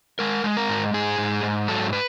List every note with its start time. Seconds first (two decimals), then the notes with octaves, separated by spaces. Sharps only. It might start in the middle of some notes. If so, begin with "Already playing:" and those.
0.19 G#3 A#4
0.44 G#3
0.57 A#4
0.69 G#2
0.94 G#2 G#4
1.18 G#2
1.43 G#2
1.68 F#3 A4
1.93 B4